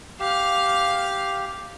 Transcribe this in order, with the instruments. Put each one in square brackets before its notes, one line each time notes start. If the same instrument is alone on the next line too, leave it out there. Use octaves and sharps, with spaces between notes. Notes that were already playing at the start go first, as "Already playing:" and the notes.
[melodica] G4 [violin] F5 F6